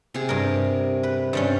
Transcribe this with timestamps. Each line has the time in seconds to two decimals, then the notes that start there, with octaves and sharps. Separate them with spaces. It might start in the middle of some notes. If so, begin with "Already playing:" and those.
0.14 C3 G#4
0.29 G2 A#4
1.03 B4
1.33 G2 G3 C#4